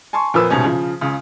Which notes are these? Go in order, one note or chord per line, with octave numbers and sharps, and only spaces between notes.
G#5 A5 C6 C#6
F2 A#2 F3 A#3 B4 E6
D#1 C2 G#2 B2 C#4
C#3 F3
C#2 C#3